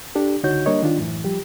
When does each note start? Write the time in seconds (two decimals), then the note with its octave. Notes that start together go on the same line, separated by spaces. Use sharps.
0.15 D4 G4 A4
0.43 C#2 D3 D#4 F#4 C#5 G6
0.66 G3 A#3 D4 A#4 C#5 D#5
0.82 D#3 D4 F4
0.97 F#2 A2 E3
1.25 F3 G3 G4